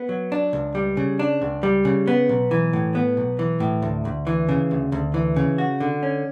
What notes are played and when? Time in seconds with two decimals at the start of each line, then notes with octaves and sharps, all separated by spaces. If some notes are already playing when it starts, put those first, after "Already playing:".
Already playing: B3
0.09 F#3
0.32 D4
0.53 C#2
0.75 G3
0.97 C#3
1.19 D4
1.42 C#2
1.63 G3
1.85 C#3
2.07 B3
2.29 B1
2.51 E3
2.73 A2
2.95 B3
3.17 B1
3.39 E3
3.60 A2
3.82 D2
4.05 D2
4.27 E3
4.49 C#3
4.71 D2
4.92 D2
5.14 E3
5.36 C#3
5.58 F#4
5.80 D3
6.03 C#4